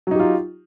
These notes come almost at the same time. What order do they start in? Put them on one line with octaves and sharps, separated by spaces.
F#3 D#4 G4 F4